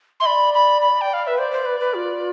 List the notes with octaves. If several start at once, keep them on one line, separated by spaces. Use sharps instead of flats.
E5 C6
D5 B5
B5
B5
G5
F5
B4 E5
C5 D5
C5
B4
B4
F4